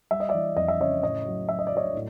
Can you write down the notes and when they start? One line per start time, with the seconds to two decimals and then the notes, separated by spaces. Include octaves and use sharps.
0.11 G3 E5
0.20 D#5
0.29 D5 E5
0.34 E3
0.56 F2 D#5
0.68 E5
0.80 C#3 C#5 D#5
1.03 A2 C#5 D#5
1.26 F#3
1.49 F#3 E5
1.59 D#5
1.67 D5
1.72 F#3 C#5 D#5
1.94 A2